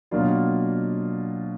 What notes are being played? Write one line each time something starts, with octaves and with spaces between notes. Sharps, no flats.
B2 F#3 A#3 D4 F4